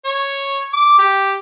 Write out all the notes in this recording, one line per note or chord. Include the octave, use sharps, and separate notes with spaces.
C#5
D6
G4